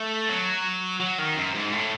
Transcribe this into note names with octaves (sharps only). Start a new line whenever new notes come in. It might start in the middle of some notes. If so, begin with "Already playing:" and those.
Already playing: A3
F#3
F#3
D#3
F#2
G#2
A2